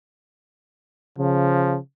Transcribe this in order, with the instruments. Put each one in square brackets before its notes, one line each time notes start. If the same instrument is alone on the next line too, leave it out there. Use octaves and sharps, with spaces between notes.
[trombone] C#3 [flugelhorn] F3